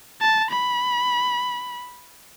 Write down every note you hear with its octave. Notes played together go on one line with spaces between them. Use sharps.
A5
B5